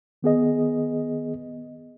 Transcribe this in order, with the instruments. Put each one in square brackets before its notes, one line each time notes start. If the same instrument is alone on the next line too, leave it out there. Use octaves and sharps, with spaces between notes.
[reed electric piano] D#3 B3 G#4 D#5